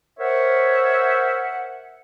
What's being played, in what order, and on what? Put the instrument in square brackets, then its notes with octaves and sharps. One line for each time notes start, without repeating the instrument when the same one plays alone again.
[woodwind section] A#4 C5 C#5 E5 F#5